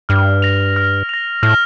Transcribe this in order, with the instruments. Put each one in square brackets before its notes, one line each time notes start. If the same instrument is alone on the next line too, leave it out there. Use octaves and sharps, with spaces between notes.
[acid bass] G2 [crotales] F6
[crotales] A#6 F7
F6
A#6 F7
[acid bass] A2 [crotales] F6